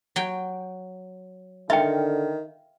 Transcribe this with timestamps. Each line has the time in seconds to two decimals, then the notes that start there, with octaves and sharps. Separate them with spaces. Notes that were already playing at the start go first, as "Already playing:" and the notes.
0.16 F#3 G5
1.70 D3 D#3 F4 E5 G5